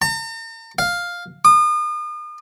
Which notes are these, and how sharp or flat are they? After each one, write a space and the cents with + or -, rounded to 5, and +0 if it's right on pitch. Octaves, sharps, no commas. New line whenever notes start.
A#5 -45
F5 +5
D#6 -40